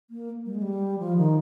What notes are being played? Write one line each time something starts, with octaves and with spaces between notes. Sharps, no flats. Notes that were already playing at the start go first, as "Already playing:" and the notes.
A#3
G3
G#3
G3
F3
D#3